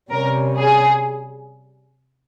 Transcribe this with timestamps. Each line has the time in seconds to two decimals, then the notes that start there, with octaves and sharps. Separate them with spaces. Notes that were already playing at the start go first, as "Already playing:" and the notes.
0.11 C3 G3 C#4 A#4
0.59 G#4